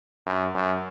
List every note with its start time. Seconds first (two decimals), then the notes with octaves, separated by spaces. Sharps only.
0.26 F#2
0.55 F#2